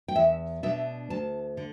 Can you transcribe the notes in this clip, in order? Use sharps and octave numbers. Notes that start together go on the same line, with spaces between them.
G5
E2 E5
B2 B3 D4 E5
D2 A5
D3